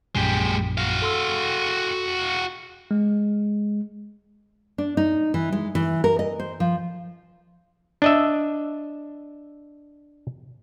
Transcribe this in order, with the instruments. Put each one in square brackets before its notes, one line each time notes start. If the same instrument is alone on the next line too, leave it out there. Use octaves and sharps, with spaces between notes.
[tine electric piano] A#1 F#2 A#2 [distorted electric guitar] G#3 G4
[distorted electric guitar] F#4 F5
[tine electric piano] A4 C6 E6
G#3
[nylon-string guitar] D4
D#4
E3
G#3
E3
A#4
D#5
C5
F3
[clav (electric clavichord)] D4 D#5 E5